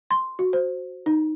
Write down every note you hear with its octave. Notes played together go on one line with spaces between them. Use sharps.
C6
F#4
C5
D#4